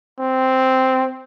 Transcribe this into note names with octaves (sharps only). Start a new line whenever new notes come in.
C4